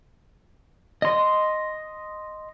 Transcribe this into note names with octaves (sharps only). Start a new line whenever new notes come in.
D#5 C6